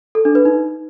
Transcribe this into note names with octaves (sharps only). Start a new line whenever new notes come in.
A4
D4
B4
D#4